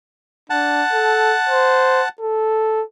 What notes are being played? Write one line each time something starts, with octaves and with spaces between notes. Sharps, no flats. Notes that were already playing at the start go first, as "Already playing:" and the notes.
D4 F#5 A5
A4
C5
A4